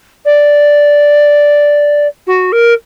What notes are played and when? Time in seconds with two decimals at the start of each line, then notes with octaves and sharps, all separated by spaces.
0.25 D5
2.27 F#4
2.52 A#4